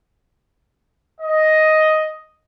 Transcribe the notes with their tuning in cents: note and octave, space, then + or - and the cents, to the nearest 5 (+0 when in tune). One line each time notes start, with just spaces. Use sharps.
D#5 +5